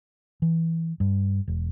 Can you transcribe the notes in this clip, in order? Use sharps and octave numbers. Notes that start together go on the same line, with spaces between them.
E3
G2
E1